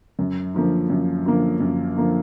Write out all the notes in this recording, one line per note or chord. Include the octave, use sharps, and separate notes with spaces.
F#2
D3 F3 A#3
F#2
D3 F3 A#3
F#2
D3 F3 A#3